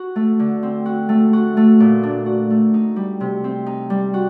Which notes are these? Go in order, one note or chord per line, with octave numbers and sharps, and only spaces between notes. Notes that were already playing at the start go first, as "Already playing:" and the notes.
Already playing: F#4
A3
D3
C4
F#4
A3
F#4
A3
A#2
D4
F#4
A3
D#4
G3
C3
C4
D#4
G3
F#4